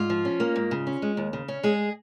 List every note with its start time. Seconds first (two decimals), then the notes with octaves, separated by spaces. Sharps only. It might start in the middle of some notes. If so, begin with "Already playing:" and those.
Already playing: G#2 F4
0.10 F3
0.25 C#4
0.40 A#3
0.56 G#2
0.71 C#3
0.87 C#4
1.02 G#3
1.17 D#2
1.33 C#3
1.48 C#4
1.63 G#3 G#4